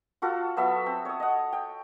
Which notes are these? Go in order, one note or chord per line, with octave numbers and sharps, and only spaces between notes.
F4 F#4 A4
F#3 B3 A4 E5
C4
C#5 D#6
D#5 F#5
G5